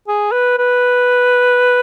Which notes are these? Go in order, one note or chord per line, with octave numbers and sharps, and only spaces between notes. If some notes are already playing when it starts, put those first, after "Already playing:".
G#4
B4
B4